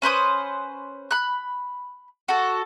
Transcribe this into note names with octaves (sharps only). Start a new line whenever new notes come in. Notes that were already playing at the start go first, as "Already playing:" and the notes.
C#4 B4 C5 D#6
B5 F#6
F#4 A4